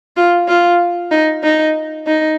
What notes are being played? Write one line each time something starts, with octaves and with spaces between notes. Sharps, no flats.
F4
F4
D#4
D#4
D#4